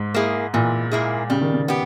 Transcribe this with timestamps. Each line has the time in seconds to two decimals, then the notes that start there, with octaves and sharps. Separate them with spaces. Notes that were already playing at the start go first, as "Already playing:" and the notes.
Already playing: G#2
0.14 A#3 E4 G#4
0.54 A#2 E3
0.92 A#3 E4 G#4
1.30 C#3 G3
1.41 D#3
1.54 C#3
1.68 B3 G4